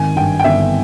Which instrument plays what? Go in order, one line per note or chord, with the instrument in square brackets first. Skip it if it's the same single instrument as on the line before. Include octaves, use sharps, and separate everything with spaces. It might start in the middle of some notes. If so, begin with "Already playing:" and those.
Already playing: [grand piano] G#1 D#3 [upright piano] G#5
[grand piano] G2 [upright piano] G5
[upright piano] G5
[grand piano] G1 [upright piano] E5